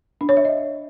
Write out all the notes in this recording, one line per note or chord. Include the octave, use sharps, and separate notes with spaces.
D4
C#5
E5
D#5